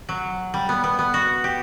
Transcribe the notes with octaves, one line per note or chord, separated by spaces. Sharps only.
F#3
G3
B3
B3
B3
F#4
G4